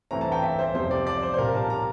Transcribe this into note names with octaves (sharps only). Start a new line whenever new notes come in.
G2 E3 A3 C4 A#5
A5
G5
E5
C5
F2 C3 G3 C4 C5
D5
D5
C5
C5
A#2 G3 C4 A#4
A5
A#5